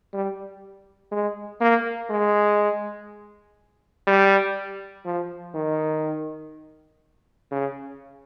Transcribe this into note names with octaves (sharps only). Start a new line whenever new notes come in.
G3
G#3
A#3
G#3
G3
F3
D#3
C#3